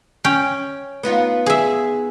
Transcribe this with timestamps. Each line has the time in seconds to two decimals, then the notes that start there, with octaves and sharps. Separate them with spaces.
0.24 C#4 G5
1.03 B3 D#4 F4
1.46 G#4 E5